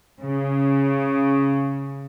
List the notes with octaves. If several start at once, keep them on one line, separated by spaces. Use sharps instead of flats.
C#3